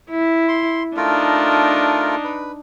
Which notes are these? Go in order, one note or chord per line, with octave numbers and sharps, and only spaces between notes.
E4
C6
A3 D4 D#4 F4 A#4
B4